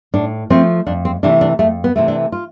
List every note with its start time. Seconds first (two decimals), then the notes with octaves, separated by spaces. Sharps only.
0.14 A2 D4
0.50 F3 A3 C4
0.87 F2 D4
1.05 C4
1.23 C3 E3 A3 D4
1.41 D4
1.59 F2 A3
1.84 B3
1.96 C3 E3 A3
2.08 D4
2.32 F4